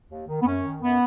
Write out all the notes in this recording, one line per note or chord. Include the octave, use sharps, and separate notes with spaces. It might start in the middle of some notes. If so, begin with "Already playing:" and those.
D#2
D#3
B3
F#2 C#4
D#3
F#2 B3